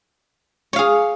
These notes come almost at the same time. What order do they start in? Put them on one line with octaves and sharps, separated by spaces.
C#5 F5 G#4